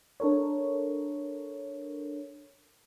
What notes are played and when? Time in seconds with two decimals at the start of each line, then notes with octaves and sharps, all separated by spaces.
0.20 D4 A4 A#4 C#5